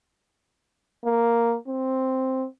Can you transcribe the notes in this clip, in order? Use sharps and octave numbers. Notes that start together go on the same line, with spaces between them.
A#3
C4